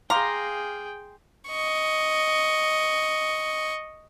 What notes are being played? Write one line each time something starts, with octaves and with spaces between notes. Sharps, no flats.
G#4 F5 G5 A#5 C6 D6
D#5 C#6